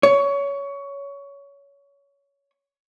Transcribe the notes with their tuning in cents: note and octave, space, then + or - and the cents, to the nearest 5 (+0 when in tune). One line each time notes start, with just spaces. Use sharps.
C#5 +20